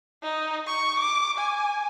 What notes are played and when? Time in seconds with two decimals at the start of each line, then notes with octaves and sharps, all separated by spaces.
0.23 D#4
0.66 C#6
0.99 D6
1.38 G#5